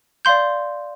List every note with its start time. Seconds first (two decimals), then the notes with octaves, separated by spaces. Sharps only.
0.25 D5 F5 C6 G6